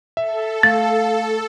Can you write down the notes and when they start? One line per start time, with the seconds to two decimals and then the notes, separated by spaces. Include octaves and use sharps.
0.17 A4 E5
0.63 A3 F5 A6